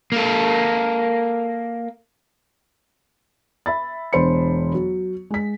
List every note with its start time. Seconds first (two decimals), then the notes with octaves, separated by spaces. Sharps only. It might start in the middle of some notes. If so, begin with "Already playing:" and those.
0.12 A#3 A4
3.66 E5 B5 A6
4.13 E1 D4 C5 B5 C#7
4.74 F#3
5.30 G#3 B6